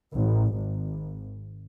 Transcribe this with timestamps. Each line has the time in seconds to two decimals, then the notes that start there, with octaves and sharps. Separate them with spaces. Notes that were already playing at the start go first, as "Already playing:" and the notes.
0.13 A1
0.53 G#1